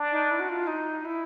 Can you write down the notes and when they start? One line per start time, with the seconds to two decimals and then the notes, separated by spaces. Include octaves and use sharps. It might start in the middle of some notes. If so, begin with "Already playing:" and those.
Already playing: D4
0.12 D#4
0.31 E4
0.40 F#4
0.49 F4
0.67 D#4
1.05 E4